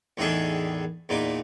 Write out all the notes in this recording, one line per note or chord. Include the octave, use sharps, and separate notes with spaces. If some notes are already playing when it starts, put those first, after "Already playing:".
E2 A2 D#3 D4 G#4 A4
E2 A#2 D#4 D6